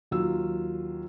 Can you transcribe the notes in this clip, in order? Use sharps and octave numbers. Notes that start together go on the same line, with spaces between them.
D#2 F#3 F4 E6